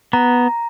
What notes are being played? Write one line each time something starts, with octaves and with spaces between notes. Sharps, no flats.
B3 A#5